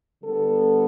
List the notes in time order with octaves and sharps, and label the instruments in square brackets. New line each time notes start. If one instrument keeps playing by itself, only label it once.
[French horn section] D3 G3 B3 A4